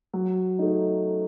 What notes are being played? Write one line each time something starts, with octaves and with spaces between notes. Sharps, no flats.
F#3
A3 D#4